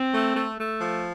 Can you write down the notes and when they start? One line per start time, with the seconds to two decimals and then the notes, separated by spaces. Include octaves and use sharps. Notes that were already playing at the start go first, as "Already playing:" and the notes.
Already playing: C4
0.13 A3
0.35 A3
0.57 A3
0.80 F3